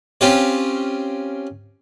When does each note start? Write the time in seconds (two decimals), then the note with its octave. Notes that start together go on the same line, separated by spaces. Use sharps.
0.21 C4 C#4 F4 G4 C#5